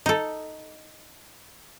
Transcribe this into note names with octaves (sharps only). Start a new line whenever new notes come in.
D#4 A4